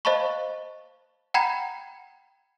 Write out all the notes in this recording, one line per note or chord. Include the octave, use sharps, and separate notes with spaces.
C5 D#5 F5 A5 B5 C#6
F#5 G5 A#5 B5 G#6 C#7